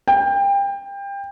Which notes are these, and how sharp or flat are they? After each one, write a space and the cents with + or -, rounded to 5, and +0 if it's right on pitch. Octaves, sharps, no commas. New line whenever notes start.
G5 +25